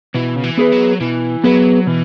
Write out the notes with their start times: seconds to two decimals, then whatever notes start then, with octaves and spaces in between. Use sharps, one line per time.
0.15 B2 E3
0.36 C#3
0.44 E3
0.57 B3 G#4 B4
0.72 F#3
1.01 B2 E3
1.44 F#3 B3 G#4 B4
1.87 B2 E3